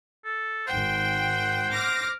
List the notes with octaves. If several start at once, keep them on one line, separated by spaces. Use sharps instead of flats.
A4
G#1 C5 F#5 G5
D6 F6 A#6